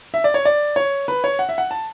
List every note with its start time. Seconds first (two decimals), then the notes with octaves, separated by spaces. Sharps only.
0.14 E5
0.24 D5
0.34 C#5
0.45 D5
0.76 C#5
1.08 B4
1.24 C#5
1.39 F#5
1.49 E5
1.58 F#5
1.71 A5